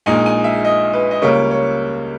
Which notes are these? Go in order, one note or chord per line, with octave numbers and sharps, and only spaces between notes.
A#1 A#2 G#3 D#4 G#5
G#5
E5
D#5
B4
D#5
C#2 C#3 G3 A#3 C#5
C#5